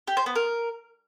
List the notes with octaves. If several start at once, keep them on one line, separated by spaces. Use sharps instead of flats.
G4
C5
B3
A#4